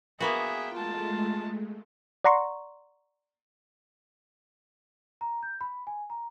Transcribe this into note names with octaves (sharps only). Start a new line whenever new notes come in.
A#3 B3 F#4 G#4 E5 G5
G#3 A3 F4 A5
D5 F#5 A#5 C6 C#6
A#5
G6
B5
G#5
A#5